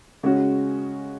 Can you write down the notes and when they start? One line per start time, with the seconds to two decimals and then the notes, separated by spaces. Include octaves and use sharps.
0.23 C#3 G#3 C#4 F#4